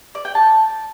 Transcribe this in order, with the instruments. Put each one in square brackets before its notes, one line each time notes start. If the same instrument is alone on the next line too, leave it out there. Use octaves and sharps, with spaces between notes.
[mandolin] D5
G5
A5